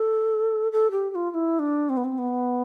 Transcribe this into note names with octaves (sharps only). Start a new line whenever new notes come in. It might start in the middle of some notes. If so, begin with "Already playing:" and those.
Already playing: A4
A4
G4
G4
F4
F4
E4
D4
C4
B3
C4
B3